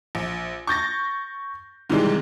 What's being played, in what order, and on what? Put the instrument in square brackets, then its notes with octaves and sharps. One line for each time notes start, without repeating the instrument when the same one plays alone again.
[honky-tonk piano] A#1
C#6 G6 A6 A#6
G#2 C3 D#3 E3 G3 G#3